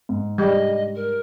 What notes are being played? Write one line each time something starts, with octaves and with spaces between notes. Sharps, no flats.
G#2
G3 D#5
A#4